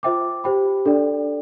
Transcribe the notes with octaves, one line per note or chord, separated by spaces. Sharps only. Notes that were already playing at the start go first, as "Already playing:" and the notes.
F4 C5 E5 G5 D6
G4 C5 G5 B5
D4 A4 D5 G5